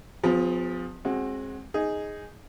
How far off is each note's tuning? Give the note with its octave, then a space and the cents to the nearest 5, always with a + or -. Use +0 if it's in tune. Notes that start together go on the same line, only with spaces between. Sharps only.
F3 +25 C4 -45 G#4 -30
G#3 +0 C4 +30 F#4 +0
D#4 +0 G#4 +0